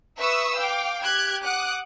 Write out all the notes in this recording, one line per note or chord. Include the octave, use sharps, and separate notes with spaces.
B4 E5 C#6 D#6 E6
F5 G5 D6
G4 F#6 G#6
F#5 D6 D#6 F#6